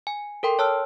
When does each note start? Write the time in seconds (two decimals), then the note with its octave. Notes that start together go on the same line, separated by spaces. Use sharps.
0.07 G#5
0.43 A4 A#4 G5 C6
0.59 C#5 A5 E6 F6